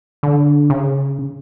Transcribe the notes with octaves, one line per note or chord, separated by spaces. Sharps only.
D3
C#3